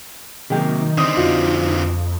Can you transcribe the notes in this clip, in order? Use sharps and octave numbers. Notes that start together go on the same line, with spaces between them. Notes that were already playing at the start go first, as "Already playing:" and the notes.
C3 D#3 F#3 A#3 G#4 G5
D3 C4 D#4 D#6
F2 F4 F#4